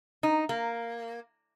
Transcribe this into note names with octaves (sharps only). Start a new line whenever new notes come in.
D#4
A#3